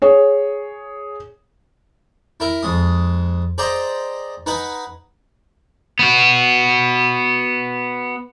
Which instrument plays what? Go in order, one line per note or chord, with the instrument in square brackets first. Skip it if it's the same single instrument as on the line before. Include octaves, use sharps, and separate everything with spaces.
[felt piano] G#4 C#5
[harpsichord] E4 A#4
F2 G#3 D#6
G#4 C5 D5 D#5 G5 A#5
D#4 B4 F#5 G#5
[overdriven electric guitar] B3 F#4